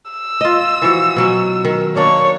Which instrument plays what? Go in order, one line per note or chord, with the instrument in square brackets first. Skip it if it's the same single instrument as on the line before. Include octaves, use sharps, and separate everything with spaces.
[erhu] E6
[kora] F4 D#5
E3 F3 F#4
B2 F#3 C#4
D#3
[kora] A#3 D4 [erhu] C#5